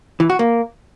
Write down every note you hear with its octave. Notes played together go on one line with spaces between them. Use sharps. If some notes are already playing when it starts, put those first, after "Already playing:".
E3
F#4
A#3